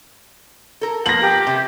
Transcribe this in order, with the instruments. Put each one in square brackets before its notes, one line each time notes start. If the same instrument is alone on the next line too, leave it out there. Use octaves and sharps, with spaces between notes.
[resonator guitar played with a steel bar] A4 A#4
[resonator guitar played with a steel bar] F3 A#3 B3 [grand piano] A#6 F#7
[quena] G4
[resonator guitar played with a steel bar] C3